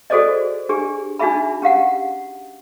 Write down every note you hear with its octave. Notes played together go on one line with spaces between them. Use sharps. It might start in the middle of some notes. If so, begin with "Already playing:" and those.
F#4 G#4 A4 C5 D5 D#5
D4 G4 G#4
D4 D#4 F#4 G#4 E5 B5
C#4 G4 F5 F#5